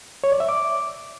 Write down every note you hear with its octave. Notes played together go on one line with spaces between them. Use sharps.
C#5
D5
E5
D6